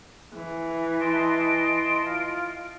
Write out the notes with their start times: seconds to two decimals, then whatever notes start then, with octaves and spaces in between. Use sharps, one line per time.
0.35 E3
1.01 D#5 A5 C6 D7
2.04 F4